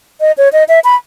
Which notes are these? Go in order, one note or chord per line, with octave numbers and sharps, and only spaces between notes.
D#5
C#5
D#5
E5
B5